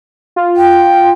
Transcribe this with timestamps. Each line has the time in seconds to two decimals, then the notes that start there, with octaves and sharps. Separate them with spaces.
0.36 F4
0.57 G5